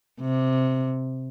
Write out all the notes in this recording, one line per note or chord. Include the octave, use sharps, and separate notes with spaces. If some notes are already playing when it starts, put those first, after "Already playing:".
C3